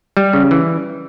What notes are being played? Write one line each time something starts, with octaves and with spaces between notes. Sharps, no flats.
G3
C#3
E3